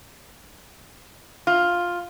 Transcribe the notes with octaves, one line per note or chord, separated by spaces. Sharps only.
F4